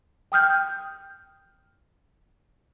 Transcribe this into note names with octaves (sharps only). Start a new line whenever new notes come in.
G5 D#6 F6 G6